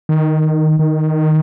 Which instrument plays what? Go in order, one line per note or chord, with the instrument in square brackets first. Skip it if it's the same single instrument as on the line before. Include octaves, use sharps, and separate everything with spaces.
[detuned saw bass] D#3
D#3